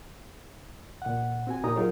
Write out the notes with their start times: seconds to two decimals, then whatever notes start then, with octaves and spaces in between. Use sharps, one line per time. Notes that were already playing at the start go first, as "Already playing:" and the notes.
1.02 A#2 F#5
1.47 C4 F#4 G#5
1.63 A#2 A#3 D#4 G4 A#5 D#6
1.76 F#3 D#4 F4 G#4 A#4 C#5